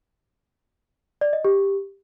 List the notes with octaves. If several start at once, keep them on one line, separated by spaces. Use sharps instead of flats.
D5
D#5
G4